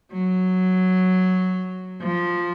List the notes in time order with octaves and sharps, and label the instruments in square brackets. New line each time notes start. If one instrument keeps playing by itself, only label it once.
[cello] F#3
F3